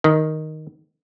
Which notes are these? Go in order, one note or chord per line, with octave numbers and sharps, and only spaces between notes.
D#3